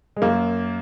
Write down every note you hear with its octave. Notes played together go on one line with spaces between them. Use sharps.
G#3
F#2 A#3